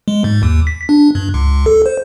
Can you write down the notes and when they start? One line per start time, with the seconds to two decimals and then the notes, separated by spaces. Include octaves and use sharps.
0.08 G#3
0.24 G#2
0.43 D#2
0.67 B6
0.89 D4
1.15 G2
1.34 C#2
1.66 A4
1.86 C5